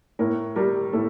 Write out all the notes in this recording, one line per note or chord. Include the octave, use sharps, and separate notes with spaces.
A2 A#4
G3 A#4
A2 A4